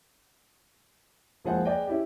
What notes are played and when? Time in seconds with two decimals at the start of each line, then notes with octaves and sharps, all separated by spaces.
1.44 F#1 C#2 F3 G#4 C5 F#5
1.65 G#4 B4 D5 D#5 G5
1.87 C#4 E4 G4